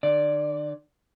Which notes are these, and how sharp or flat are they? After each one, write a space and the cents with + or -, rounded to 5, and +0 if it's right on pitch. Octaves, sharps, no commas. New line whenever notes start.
D3 +45 D5 +0